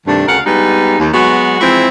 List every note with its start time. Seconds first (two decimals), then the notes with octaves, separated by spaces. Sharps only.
0.06 G2 C3 D#3 A3 D4
0.27 D2 C#3 A#4 F5 F#5
0.45 G3 G#3 B3 D#4 B4
0.99 D#2
1.13 F#3 G#3 B3 F#4
1.60 E3 F3 G#3 C4 E4